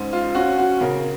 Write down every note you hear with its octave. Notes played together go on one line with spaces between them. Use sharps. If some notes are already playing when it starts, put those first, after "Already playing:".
Already playing: G#2 C#4
F4
C#4 F#4
F#4
C#3 A#4